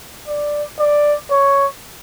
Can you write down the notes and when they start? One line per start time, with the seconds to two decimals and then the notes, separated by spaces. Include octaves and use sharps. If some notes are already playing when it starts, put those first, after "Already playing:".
0.28 D5
0.79 D5
1.31 C#5